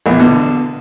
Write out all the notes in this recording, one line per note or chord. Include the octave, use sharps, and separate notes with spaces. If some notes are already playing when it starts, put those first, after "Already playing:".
A#1 E2
B2 D3